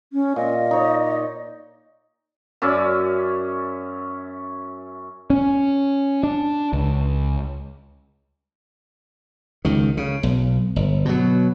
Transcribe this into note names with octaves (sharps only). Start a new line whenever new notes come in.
C#4
A#2 D#5
D#4 C#5 D5
F#2 C#4 D5 E5
C#4
D4
C#2
C#2 D#3
C#3
B1
G1
B2 F#3